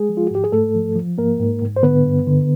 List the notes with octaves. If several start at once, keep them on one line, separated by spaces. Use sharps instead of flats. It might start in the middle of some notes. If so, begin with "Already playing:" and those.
Already playing: G#3 G#4
F3
F4
F#4
G#2 G4
G#4
G#2 A3 A4
F3
F3
G#2 A#3 A#4
G#2
G#2
C5
D3 B3 B4
G2
D3